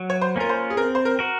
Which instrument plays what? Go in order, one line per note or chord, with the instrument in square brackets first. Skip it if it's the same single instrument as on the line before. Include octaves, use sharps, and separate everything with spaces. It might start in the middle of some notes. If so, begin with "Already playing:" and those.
Already playing: [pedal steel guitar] F#3
[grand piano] C#5
C5
[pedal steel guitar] A#3 C#4 F4 [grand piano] A#4
[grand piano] C5
G#4
[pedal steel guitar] C4 [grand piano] A#4
[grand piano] C5
A#4
[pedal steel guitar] F#4 A#4